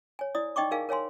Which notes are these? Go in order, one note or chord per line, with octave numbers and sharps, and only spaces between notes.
C#5 G#5
E4 D5 D#6
D#4 D#5 G5 C#6 D6
D#4 G#4 A#4 F5 G#5
A#4 C#5 F5 G#5 C6